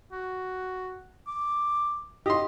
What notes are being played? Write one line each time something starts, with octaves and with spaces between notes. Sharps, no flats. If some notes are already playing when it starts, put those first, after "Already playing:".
F#4
D6
G4 D#5 C6